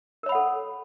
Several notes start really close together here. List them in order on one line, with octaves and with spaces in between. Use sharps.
A#4 C#5 B5 F#5 A4